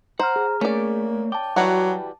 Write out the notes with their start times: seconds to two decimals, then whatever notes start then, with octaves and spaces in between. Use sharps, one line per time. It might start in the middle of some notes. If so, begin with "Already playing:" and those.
0.19 C5 F#5 A#5 F6
0.36 G#4
0.61 A3 A#3 C#4 D5
1.32 G5 A5 D6
1.56 E3 F#3 G3 F#4